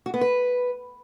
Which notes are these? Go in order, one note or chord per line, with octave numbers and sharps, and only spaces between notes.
F#4
B3
B4